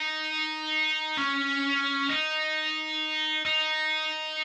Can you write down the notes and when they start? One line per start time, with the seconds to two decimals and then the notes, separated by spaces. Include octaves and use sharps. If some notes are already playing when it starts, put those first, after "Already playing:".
Already playing: D#4
1.17 C#4
2.09 D#4
3.45 D#4